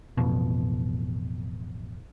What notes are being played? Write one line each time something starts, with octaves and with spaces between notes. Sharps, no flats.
A1 F2 B2